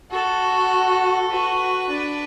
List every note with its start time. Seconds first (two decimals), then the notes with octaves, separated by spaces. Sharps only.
0.11 F#4 A4
1.31 F#4 B4
1.91 D4